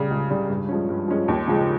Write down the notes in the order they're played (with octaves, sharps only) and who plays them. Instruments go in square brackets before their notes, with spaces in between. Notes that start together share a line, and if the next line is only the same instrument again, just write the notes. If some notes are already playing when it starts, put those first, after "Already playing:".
Already playing: [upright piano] C#3 G3
C#2
C#3 G3
G2
F3 G#3 C#4
G2
F3 G#3 C#4
D#2
C#3 F3 G#3